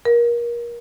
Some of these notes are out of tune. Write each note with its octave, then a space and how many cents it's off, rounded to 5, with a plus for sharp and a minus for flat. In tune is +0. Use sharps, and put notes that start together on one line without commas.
A#4 +25